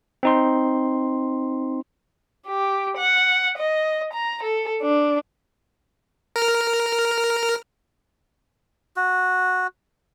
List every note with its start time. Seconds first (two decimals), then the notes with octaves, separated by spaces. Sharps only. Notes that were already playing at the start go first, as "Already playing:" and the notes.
0.23 C4 D#4 C6
2.48 G4
2.98 F#5
3.58 D#5
4.13 A#5
4.43 A4
4.82 D4
6.36 A#4 F6
8.97 F#4